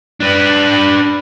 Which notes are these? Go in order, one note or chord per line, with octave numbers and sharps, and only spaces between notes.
D4 B4